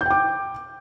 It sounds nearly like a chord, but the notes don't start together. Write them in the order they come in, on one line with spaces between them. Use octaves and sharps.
G6 G5 D6